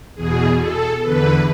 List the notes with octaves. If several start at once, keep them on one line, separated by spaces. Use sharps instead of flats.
E2 B2 G#4
A4
E2 D3 B4